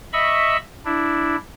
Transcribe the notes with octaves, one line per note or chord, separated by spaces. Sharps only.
D#5 E5 B5 C#6 E6
D4 E4